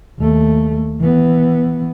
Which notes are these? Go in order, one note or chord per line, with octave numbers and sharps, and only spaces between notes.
D#2 A3
E3 B3